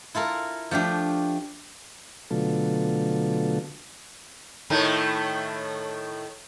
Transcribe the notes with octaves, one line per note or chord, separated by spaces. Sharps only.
E4 F4 A4 A#4
F3 A3 D4 G4
B2 D3 F#3 A3 F4 A4
A2 D#3 A3